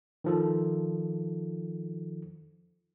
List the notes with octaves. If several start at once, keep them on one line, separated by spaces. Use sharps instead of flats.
D#3 F3 A4